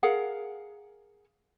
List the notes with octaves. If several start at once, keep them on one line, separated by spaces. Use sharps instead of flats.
G#4 A#4 F5 F#5